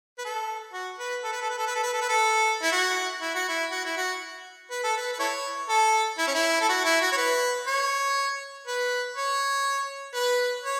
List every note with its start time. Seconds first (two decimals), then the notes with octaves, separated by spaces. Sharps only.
0.18 B4
0.25 A4
0.73 F#4
0.99 B4
1.24 A4
1.32 B4
1.41 A4
1.50 B4
1.58 A4
1.67 B4
1.75 A4
1.83 B4
1.93 A4
2.01 B4
2.09 A4
2.62 E4
2.72 F#4
3.21 E4
3.35 F#4
3.49 E4
3.71 F#4
3.85 E4
3.97 F#4
4.70 B4
4.83 A4
4.97 B4
5.13 B4
5.19 E4 A4 C#5
5.69 A4
6.18 E4
6.27 C#4
6.35 E4
6.61 A4
6.69 F#4
6.85 E4
7.01 F#4
7.12 C#5
7.17 B4
7.67 C#5
8.67 B4
9.17 C#5
10.15 B4
10.64 C#5